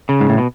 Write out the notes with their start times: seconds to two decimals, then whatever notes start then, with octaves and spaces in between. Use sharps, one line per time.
0.09 C#3
0.21 G#2
0.29 A2
0.38 B2